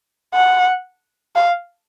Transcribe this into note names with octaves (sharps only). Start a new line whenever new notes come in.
F#5
F5